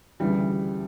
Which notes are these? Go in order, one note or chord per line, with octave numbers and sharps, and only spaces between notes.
D2 C#3 E3 G3